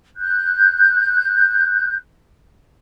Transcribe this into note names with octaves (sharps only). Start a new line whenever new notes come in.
F#6 G6